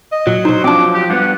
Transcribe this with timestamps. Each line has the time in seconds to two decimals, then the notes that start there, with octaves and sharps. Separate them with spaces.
0.12 D#5
0.27 A#2 F#3
0.45 B2 D#4 C5
0.64 F3 C4 D4 D6
0.95 G4
1.10 G2 B3 F#5